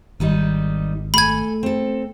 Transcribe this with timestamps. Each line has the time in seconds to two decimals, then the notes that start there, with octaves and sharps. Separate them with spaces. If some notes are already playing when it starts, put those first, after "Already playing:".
0.20 G#1 D#3 G3 D#4
1.14 A3 A4 G#5 B5 G#6
1.63 C4 A4